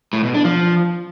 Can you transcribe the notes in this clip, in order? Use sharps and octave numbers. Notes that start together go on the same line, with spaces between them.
A2
B2
D4
F3